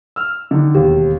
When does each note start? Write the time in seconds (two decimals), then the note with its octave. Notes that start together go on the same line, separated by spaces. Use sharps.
0.16 E6 F6
0.51 D3 D#3 D#4
0.75 E1 D#2 G4